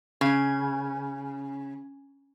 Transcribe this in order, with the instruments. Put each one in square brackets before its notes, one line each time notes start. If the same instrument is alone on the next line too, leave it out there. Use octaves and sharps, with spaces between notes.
[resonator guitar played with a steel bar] C#3 [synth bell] C#4 G#5